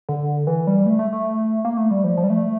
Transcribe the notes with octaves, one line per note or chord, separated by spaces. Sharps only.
D3
E3
G3
A3
A3
A3
A#3
A3
G3
F3
F3
G3
A3